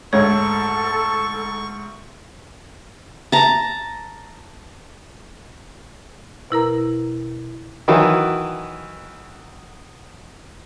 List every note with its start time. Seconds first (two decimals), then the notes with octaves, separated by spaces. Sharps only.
0.13 D2 G#2 G#3 A4 C#5 C#6
3.32 A5 A#5
6.51 B2 E4 A#4 A#5
7.88 D#3 E3 F#3